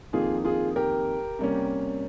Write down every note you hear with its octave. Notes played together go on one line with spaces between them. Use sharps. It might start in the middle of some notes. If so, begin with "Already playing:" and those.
F2 D#3 A#3 F4 G#4
F4 G#4
G4 A#4
C3 G3 A#3 C#4